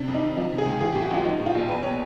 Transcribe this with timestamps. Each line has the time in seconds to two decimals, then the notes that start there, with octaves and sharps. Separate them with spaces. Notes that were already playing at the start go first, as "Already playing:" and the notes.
Already playing: C3 D4
0.08 F2
0.14 D#4
0.23 D#3
0.36 F3 D#4
0.52 C3
0.58 G#4
0.66 C#2
0.81 E3 G#4
0.92 A2 G4
1.02 F#4
1.11 A1 F4
1.25 F3 D#4
1.40 A2
1.46 F4
1.55 A#1
1.68 E2 B4
1.83 B2 C#5